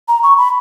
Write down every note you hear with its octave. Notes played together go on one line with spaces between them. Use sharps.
A#5
C#6
B5